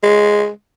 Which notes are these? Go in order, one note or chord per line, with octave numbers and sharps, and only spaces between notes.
G#3